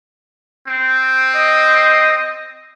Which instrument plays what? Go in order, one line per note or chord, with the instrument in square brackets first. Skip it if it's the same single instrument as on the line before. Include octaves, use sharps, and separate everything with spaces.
[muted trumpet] C4
[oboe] D#5